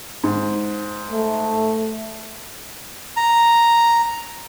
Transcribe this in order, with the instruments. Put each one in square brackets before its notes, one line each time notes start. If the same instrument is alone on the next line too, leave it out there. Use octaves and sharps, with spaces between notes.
[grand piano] G#2
[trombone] A3
[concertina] A#5